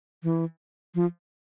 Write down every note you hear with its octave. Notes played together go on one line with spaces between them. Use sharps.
E3
F3